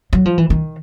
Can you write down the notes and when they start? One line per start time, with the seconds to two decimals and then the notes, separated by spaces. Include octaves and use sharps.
0.13 F#3
0.25 F3
0.38 E3
0.50 D#3